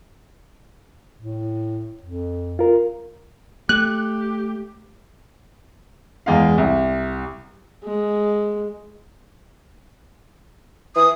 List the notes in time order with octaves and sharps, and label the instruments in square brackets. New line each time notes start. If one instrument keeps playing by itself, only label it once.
[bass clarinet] A2
F2
[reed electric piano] F4 A#4
[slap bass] A3 [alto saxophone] G4 [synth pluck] F#6
[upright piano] E2 G#3 F5
C2
[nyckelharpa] G#3
[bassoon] E3 [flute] D#6